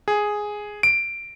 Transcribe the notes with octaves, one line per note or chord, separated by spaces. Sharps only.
G#4
D7